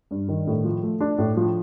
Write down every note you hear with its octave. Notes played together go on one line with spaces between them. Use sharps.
G2
D#3
A2
F3
A3
D4
A2
F3